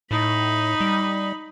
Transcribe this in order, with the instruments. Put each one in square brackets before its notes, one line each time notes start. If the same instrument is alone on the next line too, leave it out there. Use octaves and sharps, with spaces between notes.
[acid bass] A2 [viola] D#4 B5
[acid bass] G3